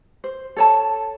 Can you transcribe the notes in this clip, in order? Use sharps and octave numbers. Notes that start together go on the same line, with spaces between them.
C5
A4 C#5 A5